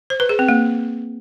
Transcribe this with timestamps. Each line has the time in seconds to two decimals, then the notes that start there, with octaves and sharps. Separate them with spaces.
0.10 C5
0.20 B4
0.29 G#4
0.39 C4
0.49 A#3